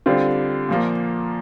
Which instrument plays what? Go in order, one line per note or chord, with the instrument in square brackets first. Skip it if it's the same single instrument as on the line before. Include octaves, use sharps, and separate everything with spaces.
[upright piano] D3 G3 C4 F4
A#2 F3 A#3